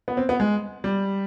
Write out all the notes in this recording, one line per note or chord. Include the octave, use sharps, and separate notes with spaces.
B3
C4
B3
G#3
G3